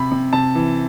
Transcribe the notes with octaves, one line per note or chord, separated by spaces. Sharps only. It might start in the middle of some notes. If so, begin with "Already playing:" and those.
Already playing: C3 B5
C3
C3 A5
E3